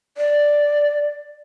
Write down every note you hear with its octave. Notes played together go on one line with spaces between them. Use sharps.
D5